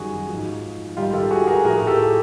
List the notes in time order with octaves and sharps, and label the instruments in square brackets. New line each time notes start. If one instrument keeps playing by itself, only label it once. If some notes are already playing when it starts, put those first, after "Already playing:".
Already playing: [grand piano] F#2 D#3 G3 F#4 G#4
G#2 F3
G#2 D#3 G3 F4 G4
G4 A4
F#4 G#4
G#4 A#4
A2 F3 G#4 A#4
G4 A4